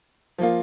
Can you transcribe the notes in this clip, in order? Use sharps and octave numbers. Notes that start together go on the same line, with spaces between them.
F3 A#3 F4